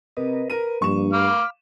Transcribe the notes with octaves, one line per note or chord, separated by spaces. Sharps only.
C3 A#4 B4 D#5
A#4 B4 D#7
G2 F3 A#3 D4 C#6 E7
F5 B5 D6 F6